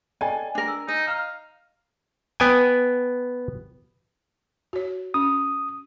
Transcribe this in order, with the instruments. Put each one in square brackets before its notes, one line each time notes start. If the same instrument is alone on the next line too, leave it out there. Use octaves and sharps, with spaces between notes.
[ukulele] A4 [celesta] D5 D#5 G5 [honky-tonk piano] G#5
[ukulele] D4 A#4
[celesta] E6
[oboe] D#4 [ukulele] D#5
[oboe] F5 [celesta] A#5 F6
[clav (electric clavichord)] B3 G5 G#5
[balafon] F#4 C#5
[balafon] C#4 [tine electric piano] D#6